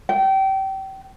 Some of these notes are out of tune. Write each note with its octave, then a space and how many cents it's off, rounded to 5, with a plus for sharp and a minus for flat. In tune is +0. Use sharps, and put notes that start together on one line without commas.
G5 -25